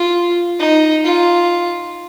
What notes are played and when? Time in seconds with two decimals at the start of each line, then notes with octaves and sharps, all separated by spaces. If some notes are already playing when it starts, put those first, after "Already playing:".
Already playing: F4
0.60 D#4
1.05 F4